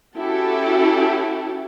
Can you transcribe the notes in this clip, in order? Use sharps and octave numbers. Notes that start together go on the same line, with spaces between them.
C#4 E4 F#4 G4 A4